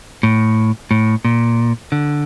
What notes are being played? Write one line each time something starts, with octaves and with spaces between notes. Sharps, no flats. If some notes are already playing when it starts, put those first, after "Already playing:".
A2
A2
A#2
D3